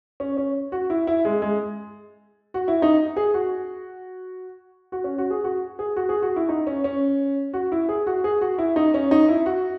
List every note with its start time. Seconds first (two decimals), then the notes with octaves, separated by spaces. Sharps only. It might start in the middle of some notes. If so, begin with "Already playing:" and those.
0.20 C#4
0.37 C#4
0.72 F#4
0.90 E4
1.07 E4
1.25 G#3
1.42 G#3
2.54 F#4
2.68 E4
2.82 D#4
3.17 G#4
3.34 F#4
4.92 F#4
5.04 C#4
5.18 F#4
5.30 G#4
5.44 F#4
5.79 G#4
5.96 F#4
6.09 G#4
6.22 F#4
6.36 E4
6.49 D#4
6.67 C#4
6.84 C#4
7.53 F#4
7.72 E4
7.89 G#4
8.07 F#4
8.24 G#4
8.41 F#4
8.58 E4
8.76 D#4
8.94 C#4
9.11 D#4
9.28 E4
9.46 F#4